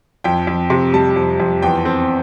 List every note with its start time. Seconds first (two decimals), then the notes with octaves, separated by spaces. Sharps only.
0.24 F2 G5
0.47 F2
0.70 C3
0.93 G3 A5
1.16 F2
1.40 F2
1.63 E2 G5
1.85 C4